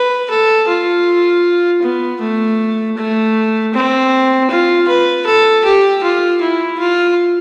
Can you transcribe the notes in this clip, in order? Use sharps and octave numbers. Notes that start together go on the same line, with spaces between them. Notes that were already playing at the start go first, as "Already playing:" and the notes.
Already playing: B4
A4
F4
B3
A3
A3
C4
F4
B4
A4
G4
F4
E4
F4